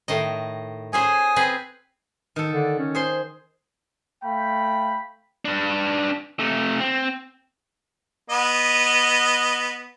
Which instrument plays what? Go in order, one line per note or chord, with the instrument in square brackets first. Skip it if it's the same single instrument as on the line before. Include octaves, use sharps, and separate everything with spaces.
[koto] A2 D#3 D#5
[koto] C#4 G#4 C5 [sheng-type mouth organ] G#5 [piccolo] D#6
[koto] C4 G#4 B4
[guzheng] D#3 A4
[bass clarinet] D3
C#4
[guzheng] G#4 C5 C6
[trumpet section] A3 F5 G5 B5
[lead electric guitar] D4 B4
C3 A3
C4
[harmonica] B3 D#5